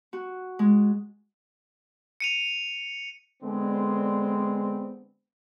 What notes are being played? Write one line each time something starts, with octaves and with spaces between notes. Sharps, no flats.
F#4
G#3
C#7 D#7 F7
D3 G#3 B3 C4 D4